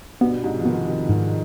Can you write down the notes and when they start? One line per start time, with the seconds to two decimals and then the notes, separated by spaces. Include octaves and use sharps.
0.21 G2 B2 B3
0.43 G#2 C3
0.59 F3
0.65 C3 D#3 B3
0.87 C3 D#3
1.09 G#2 C3 D#3